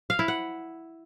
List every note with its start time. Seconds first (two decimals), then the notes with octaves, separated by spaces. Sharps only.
0.10 F5
0.19 E4
0.28 F#5